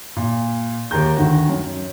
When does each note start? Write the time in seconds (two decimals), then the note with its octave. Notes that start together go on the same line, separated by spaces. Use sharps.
0.16 A#2
0.91 D#2 A#4 A#5 G6
1.17 D2 D#3 F#4
1.49 F#2